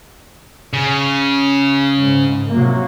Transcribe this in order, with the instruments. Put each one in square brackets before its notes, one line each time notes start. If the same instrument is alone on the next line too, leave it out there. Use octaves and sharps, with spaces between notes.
[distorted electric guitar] C#3
[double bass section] G#2
C3 F#3 A#3